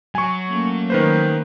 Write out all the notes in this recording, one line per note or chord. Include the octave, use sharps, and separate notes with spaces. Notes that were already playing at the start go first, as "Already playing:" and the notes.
F#3 G#5 C#6
A3 A#3 C#4
D#3 B4 C5